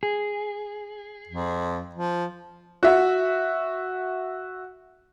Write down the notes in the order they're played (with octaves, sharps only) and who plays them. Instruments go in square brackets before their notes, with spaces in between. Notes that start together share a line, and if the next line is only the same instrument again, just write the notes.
[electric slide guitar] G#4
[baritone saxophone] F2
F3
[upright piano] F#4 E5